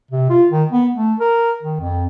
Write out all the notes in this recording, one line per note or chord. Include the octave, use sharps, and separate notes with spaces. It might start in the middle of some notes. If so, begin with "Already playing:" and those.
C3
F4
D#3
B3
A3
A#4
D#3
F2